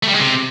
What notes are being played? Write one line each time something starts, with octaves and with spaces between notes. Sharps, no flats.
A3
G3
G#3
C3